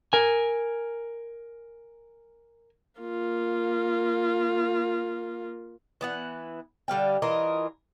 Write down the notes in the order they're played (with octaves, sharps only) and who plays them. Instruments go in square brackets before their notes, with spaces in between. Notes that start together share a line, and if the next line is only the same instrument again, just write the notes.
[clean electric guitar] A#4 G#5
[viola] A#3 F4
[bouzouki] E3 B3 F#5
D3 G3 F5 G5
E3 F4 A#4 D#5